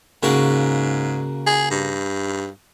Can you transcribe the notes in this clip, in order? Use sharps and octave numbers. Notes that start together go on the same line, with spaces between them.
G#2 C#3 A#3 F#4
G#4
G2